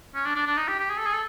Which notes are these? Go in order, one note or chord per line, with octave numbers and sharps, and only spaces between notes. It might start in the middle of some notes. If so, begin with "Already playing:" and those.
C#4
D4
D4
D4
D#4
G4
G4
G#4
A4
G#4
A4